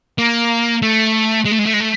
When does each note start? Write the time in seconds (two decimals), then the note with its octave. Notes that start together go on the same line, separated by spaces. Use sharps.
0.18 A#3
0.82 A3
1.45 G#3
1.52 A3
1.59 G#3
1.66 A3
1.74 G#3
1.80 A3